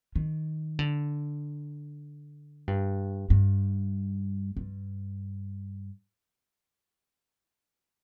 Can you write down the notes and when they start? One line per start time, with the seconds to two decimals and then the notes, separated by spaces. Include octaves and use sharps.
0.16 D#3
0.79 D3
2.68 G2
3.30 G2
4.57 G2